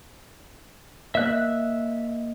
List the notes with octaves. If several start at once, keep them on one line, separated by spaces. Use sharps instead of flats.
A#3 D#5 E5 F#6